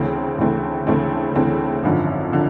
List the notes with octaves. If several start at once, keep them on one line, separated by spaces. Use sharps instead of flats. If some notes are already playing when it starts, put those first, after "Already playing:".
Already playing: D2 C#3 E3 A3 C4
D2 C#3 E3 A3 C4
D2 C#3 E3 A3 C4
D2 C#3 E3 A3 C4
G#1 F#2 D3 F3
D3 F3